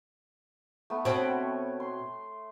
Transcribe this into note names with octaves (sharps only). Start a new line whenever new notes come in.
A3 B3
B2 C4 C#5 G5
C6